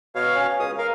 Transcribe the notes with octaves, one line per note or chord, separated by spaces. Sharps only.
B2 C#5 F5
C#4
C#2 D#6
A#4 F5